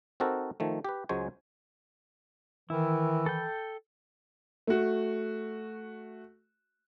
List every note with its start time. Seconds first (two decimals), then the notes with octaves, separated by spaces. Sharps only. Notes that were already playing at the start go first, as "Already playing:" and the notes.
0.20 C4 D#4 F#4 A4 A#4 C5
0.60 D#3 F3 A3
0.84 G4 B4
1.09 C#2 F#3 G#3 C5 C#5 G#5
2.70 D#3 E3 E4
3.26 A4 G5
4.67 A3 F#4